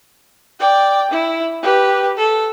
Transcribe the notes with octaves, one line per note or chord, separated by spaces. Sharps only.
D5 G5
E4
G4 B4
A4